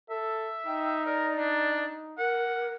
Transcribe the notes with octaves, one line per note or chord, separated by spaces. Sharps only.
A4 E5
D#4 G5
A#4 D5
D4
A#4 F#5